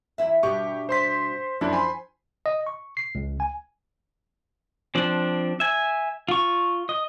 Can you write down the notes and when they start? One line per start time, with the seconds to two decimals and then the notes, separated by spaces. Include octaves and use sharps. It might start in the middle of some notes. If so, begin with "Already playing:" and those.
0.18 E2 E4 E5
0.43 G2 B2 G4 C#6
0.89 C5 C6 B6
1.61 F#2 F3 D4 E4
1.73 G#5 B5 C6
2.46 D#5
2.67 C#6
2.97 C7
3.15 C#2
3.40 G#5
4.95 F3 C4 D4
5.60 E5 G#5
6.29 F4 C#6
6.89 D#5